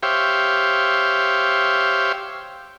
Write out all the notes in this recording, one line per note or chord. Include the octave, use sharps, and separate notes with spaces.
G4 C5 C#5 E5 F5 G5